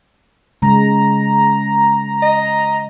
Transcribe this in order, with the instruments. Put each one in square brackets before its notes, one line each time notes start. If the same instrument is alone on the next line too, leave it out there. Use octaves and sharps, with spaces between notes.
[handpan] C#3 G#3 [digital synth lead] A#5
[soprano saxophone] D#5